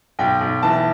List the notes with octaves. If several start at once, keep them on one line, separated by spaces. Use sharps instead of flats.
B1 G5
B1
E3 A5